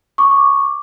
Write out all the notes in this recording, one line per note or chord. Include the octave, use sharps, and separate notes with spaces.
C#6 D6